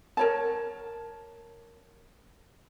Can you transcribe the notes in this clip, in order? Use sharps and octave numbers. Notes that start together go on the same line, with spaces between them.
A#4 C#5 A5